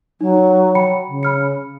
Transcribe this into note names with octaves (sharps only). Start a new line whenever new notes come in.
F#3 D#4
G5 B5 C#7
C#3
B5 F6 C#7